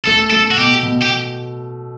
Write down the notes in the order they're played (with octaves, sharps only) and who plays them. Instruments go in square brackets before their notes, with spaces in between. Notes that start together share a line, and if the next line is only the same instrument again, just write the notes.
[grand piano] A3 [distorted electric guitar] A4
[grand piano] A3 [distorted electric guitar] A4
[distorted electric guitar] F#4
[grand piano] B2 [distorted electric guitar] G4
[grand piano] B2
[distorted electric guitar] G4